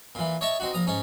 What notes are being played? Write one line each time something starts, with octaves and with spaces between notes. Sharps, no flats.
A#2 E3
C#5 D#5 E5 A5 C#6
C4 D#4 F#4
A#1 A#5 D#6
G#2 C#4 D#4